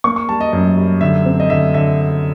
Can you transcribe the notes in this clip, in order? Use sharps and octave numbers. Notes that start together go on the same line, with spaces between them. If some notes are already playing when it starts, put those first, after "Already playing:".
A#3 C#6
C#6
G3 A5
D#5
F#2 D#5
G3
D3 E5
C4
D#5
D3 E5
D3 E5